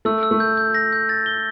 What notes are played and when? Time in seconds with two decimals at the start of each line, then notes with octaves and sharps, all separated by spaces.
0.05 A3 E6
0.23 E6
0.31 A3
0.40 G6
0.57 G6
0.74 A#6
0.92 G6
1.09 A6
1.26 G7